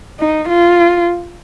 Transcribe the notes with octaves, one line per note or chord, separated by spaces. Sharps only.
D#4
F4